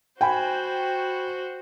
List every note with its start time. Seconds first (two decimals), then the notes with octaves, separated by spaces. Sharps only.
0.21 F#4 C5 G5 G#5 B5